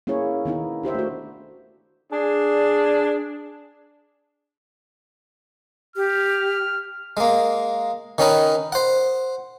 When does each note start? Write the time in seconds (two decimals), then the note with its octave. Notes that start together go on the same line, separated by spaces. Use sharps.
0.07 A#3 C#4 E4 G#4 C#5
0.45 D#3 B3 D#4 E4
0.83 D4 G4 C5 E5
0.95 A3 F#4
2.11 D4 G#4
5.96 G4 F6
7.17 G#3 A#3
8.18 D#3 C#4 D#4 B4
8.72 C5 F#5